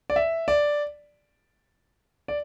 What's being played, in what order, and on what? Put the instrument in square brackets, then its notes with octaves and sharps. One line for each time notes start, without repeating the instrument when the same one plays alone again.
[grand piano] D5
E5
D5
D5